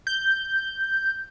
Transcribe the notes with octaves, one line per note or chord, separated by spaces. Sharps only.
G6